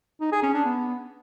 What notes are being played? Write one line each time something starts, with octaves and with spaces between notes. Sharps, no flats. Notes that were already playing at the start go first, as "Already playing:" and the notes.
D#4
G#4
C#4
D4
B3